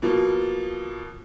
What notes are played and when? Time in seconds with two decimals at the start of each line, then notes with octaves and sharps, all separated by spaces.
0.02 B2 F3 A#3